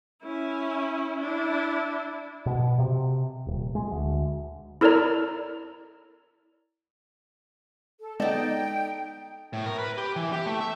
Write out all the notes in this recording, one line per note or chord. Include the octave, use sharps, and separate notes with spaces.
C#4 E4
D4 E4
B2
C3
D#1
G#3
D2
E4 A4 A#4 C#5 D5 A#5
A4
G#3 B3 D#4 A4 D5 G5
A2
A#4
B4
G4
E3
G4
A3
E5